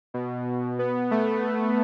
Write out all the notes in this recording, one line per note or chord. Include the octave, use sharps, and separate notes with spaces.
B2
B3
A3